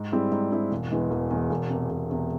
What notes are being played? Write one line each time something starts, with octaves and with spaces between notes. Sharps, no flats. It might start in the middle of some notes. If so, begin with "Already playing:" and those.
Already playing: G#2
G3 C4 E4 G#4
G#2
G3 C4 E4 G#4
E1
E2 E3 G#3
E1
E2 E3 G#3
E1
E2 C3
E1
E2 C3